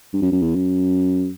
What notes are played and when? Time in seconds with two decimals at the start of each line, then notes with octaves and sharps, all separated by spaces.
0.14 G2
0.22 F#2
0.32 F#2
0.42 E2
0.55 F#2